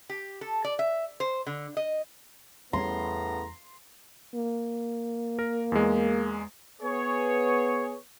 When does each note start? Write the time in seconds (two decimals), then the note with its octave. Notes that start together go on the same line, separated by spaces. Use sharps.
0.09 G4
0.41 A4
0.65 D5
0.79 E5
1.20 C5
1.47 D3
1.77 D#5
2.73 E2 A2 C#3 G3 B3 C#4 A#5 C6
4.34 A#3
5.39 A#4
5.72 E2 G#3
6.82 B3 G#4 C#5